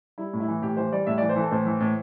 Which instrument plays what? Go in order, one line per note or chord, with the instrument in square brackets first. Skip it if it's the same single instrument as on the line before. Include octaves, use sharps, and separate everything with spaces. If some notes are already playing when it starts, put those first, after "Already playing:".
[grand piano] G3 E4
A2
E4
E3
A2 G4
E3 C5
G3 D5
A2 E5
E3 D5
C5
E3 A4
A2 C5
E3
A2